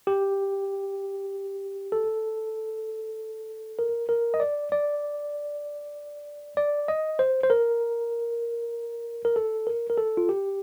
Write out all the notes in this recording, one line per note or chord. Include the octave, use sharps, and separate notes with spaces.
G4
A4
A#4
A#4
D#5
D5
D5
D5
D#5
C5
C5
A#4
A#4
A4
A#4
A#4
A4
F4
G4